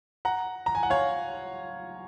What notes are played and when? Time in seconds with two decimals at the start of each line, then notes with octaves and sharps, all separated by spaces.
0.25 F#5 A#5
0.66 A#5
0.75 G#5
0.83 F#5
0.90 C#5 F5